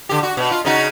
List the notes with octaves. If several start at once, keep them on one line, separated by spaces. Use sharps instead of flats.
D3 G4
F#4
B2
F4
C#3 D#4 F#4